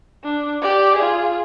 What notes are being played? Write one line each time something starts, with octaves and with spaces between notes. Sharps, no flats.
D4
G4 D5
F4 G#4